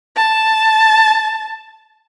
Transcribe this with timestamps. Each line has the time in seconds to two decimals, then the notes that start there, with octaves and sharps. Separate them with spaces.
0.17 A5